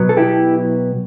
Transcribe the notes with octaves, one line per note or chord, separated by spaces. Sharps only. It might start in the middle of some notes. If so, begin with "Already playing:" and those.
Already playing: B2 F#3 B3
A4
E4 G4